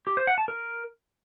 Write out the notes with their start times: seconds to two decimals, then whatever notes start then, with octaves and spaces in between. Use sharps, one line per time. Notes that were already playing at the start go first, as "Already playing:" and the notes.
0.07 G4
0.17 C5
0.27 F#5
0.38 A5
0.48 A#4